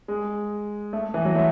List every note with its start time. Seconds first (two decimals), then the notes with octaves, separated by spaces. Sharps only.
0.08 G#3
0.93 A3
1.14 E3
1.25 F#3
1.35 A3